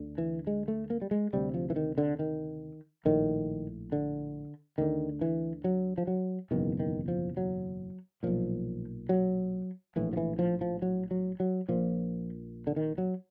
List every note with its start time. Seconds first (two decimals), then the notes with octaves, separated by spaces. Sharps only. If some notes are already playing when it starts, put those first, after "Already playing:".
Already playing: D2 D3
0.18 E3
0.47 G#3
0.68 A3
0.90 A#3
1.02 G3
1.11 G#3
1.33 D2 C3 G3
1.54 F3
1.70 E3
1.76 D#3
1.98 D3
2.19 D#3
3.05 A#1 A2 D#3
3.92 D3
4.78 D2 D3 D#3
5.21 E3
5.64 F#3
5.98 F3
6.07 F#3
6.51 F#1 E2 B2 D#3
6.80 D#3
7.08 F3
7.37 F#3
8.23 B1 A#2 F3
9.09 F#3
9.96 A#1 A2 E3
10.13 F3
10.17 E3
10.39 F3
10.61 F3
10.82 F#3
11.11 F#3
11.40 F#3
11.69 A#1 A#2 F3
12.67 D3
12.76 D#3
12.98 F#3